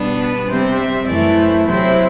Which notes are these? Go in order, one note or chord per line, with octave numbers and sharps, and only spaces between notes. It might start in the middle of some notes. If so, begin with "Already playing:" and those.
Already playing: B2 G3 B3 D4
B4
C3 G3 C4 C5
E5
F#2 E3 A3 E4 D5
C5
C3 F#3 C4 E4 C5